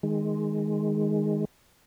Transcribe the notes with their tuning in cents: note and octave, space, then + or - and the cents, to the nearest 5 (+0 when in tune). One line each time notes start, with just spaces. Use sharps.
D#3 +10 G#3 +0